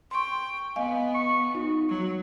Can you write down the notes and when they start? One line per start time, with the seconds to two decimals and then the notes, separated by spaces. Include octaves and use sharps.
0.11 G5 C6 C#6
0.76 B3 D#5 F5 G#5
1.14 C#6
1.55 D#4 F#4
1.88 F#3